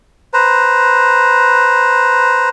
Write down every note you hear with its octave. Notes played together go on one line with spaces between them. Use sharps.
B4 C5 A#5